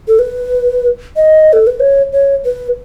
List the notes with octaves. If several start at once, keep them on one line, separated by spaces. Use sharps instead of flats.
A4
B4
D#5
A4
B4
C#5
C#5
B4